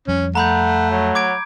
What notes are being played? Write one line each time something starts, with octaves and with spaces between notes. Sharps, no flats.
F2 F3 G3 C#4
A3 F#5 A#5 B5 G6
F#3
D6 G#6 D7